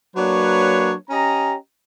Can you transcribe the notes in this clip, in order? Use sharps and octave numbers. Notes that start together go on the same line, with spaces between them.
F#3 A#3 D4 B4 C#5
C#4 G4 D#5 A#5